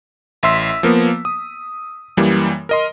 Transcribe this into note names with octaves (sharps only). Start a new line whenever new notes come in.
A1 E5 C6 E6 B6
F3 A#3 B3
D#6
F#2 E3 G3 A#3
A#4 D#5 C6